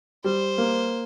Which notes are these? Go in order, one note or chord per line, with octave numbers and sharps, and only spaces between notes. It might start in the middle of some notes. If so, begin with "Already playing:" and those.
G3 C5
A#3